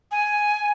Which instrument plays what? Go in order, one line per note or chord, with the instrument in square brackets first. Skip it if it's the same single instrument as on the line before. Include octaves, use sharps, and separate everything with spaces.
[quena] G#5